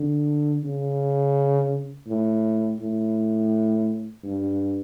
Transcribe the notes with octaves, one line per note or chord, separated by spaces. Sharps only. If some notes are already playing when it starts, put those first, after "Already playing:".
Already playing: D3
C#3
A2
A2
G2